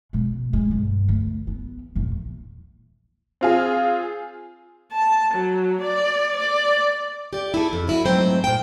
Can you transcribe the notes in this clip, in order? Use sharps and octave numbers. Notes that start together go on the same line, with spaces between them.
B2 G#3
G#3
G2
D2
B3
A#1 E2
C4 F4 G#4
A5
F#3
D5
D5
G4 D5
E4 G#4 A4
F2
C#4 E4 F#4
G#2 F#3 A3 C4 C5 G5
A#2 G5